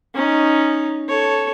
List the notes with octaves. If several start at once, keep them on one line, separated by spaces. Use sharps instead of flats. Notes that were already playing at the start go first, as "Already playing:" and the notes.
C#4 D#4
A4 C#5